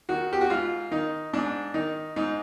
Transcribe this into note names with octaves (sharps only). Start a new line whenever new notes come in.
D#3 F#4
G4
F#4
G#2 F4
D#3 D#4
G#2 D4
D#3 D#4
G#2 D#4